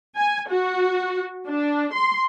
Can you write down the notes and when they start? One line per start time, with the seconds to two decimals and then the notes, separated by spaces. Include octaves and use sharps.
0.17 G#5
0.49 F#4
1.48 D4
1.93 C6